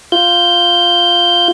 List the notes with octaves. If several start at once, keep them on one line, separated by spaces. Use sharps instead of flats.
F4 G6